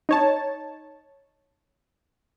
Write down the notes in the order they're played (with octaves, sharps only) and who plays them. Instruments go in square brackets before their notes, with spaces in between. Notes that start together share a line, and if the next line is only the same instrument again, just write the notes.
[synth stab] D#4 C#5 A5